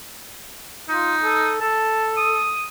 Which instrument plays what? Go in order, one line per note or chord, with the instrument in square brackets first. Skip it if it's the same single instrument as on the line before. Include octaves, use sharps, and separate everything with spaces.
[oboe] D#4 [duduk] F4
[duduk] A4
[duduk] A4 [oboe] A5
[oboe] D#6